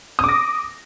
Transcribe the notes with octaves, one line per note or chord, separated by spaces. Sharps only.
D6 D#6 A#6